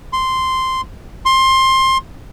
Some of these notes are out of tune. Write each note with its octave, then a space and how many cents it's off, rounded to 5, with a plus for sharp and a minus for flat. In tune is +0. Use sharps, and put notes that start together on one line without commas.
C6 -5
C6 +20